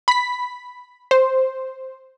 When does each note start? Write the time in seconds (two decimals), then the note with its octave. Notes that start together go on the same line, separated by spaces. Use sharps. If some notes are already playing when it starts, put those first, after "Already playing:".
0.08 B5 B6
1.11 C5